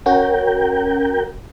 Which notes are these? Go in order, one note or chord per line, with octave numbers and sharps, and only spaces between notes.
C#4 F#4 A#4 G5